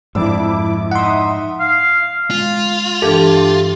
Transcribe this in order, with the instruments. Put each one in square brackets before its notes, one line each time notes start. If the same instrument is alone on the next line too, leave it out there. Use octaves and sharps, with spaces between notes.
[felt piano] F2 D4 E6 [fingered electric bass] G#2 F3 [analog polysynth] E4 D6
[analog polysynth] D#4 E5 D#6 [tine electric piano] F#5 C6
[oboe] F5
[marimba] G#3 [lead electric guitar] F4
[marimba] G2 E3 D4 [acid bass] G4 [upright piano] A4